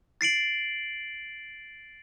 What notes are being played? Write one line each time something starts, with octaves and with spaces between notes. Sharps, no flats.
A6 C7 D7 F#7